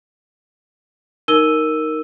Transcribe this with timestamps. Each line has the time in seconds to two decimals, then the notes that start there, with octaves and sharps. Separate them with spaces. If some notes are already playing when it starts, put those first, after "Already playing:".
1.28 D#4 A#4 E6 D#7 G7